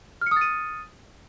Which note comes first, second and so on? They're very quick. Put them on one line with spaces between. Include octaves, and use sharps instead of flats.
F6 C#7 D#6 A6 D#7